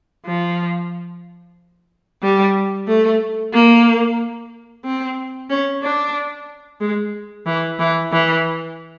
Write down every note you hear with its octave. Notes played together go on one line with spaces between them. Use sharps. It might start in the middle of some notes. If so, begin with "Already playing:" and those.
F3
G3
A3
A#3
C4
C#4
D4
G#3
E3
E3
E3